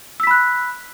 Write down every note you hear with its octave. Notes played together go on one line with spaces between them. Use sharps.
B5 E6 F#6 B6